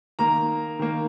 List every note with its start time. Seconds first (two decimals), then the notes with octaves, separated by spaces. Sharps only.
0.19 D#3 A#3 A#5
0.79 D#3 A#3